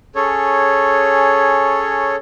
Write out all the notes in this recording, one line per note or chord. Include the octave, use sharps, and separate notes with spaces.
C#4 G#4 A4 C#5